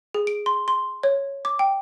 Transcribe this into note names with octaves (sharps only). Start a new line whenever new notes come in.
G#4
D7
C6
C6
C#5
D6
G5